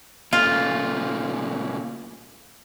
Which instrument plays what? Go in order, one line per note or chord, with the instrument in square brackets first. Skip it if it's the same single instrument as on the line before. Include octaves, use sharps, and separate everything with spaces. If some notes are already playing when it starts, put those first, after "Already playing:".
[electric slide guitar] A#2 C#3 A3 [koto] F4